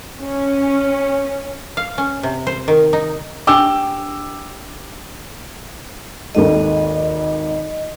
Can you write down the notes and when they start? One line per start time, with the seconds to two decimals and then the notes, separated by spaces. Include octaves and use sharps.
0.20 C#4
1.77 F5
1.98 C#4
2.23 C3
2.47 C5
2.68 D#3
2.93 D#4
3.47 D4 G4 C#6 D6 E6
6.35 G#1 D#2 A4 D#5